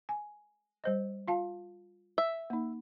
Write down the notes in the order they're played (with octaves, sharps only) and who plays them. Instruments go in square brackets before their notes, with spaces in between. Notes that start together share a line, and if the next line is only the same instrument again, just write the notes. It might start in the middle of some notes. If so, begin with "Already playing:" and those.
[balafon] G#5
G3 C5 D#5
F4 F5 A5
[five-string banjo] E5
[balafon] A#3 D#4